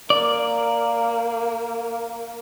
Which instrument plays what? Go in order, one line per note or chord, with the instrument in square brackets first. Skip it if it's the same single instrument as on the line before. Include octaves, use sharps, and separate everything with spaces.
[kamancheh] A#3 [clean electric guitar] D5